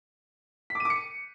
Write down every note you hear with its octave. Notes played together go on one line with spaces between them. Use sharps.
B6
D6
D#7
D6
C#7